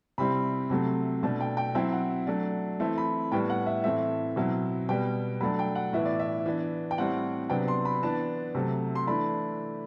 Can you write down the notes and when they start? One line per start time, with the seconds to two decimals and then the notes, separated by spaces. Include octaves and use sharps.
0.18 C3 G3 C4 E4 B5
0.70 C3 F#3 A3 C4
1.23 B2 A3 D4 A5
1.41 G5
1.57 G5
1.75 F#3 C4 E4 G5
1.93 F#5
2.27 F#3 A3 D4
2.80 E3 A3 C4 E4 E5
2.98 B5
3.32 A2 G3 B3 G5
3.50 F#5
3.66 E5
3.84 A2 E3 A3 C4 E5
4.36 B2 F#3 C4 E4
4.89 B2 G3 B3 G5
5.41 F#3 A3 D4 B5
5.59 G5
5.75 F#5
5.93 A2 E3 B3 E5
6.05 D5
6.19 E5
6.46 E3 B3 D4
6.91 G5
6.98 A2 G3 C4 E4 F#5
7.50 C3 F#3 B3 D4 G5
7.68 C6
7.85 B5
8.03 E3 B3 D4 A5
8.55 C3 F#3 A3
8.95 C6
9.07 E3 A3 D4 B5